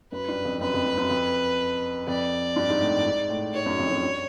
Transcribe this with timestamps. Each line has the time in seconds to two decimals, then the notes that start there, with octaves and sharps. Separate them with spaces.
0.12 F#2 B4
0.28 G2
0.45 F2
0.61 F#2 B4
0.74 F2
0.86 F#2
0.97 F#2
1.10 F2
2.07 F2 D5
2.56 G2
2.69 G#2
2.81 A2
3.05 G#2
3.29 A2
3.53 G#2 C#5
3.66 F#2
3.79 F2
3.90 F#2
4.03 G2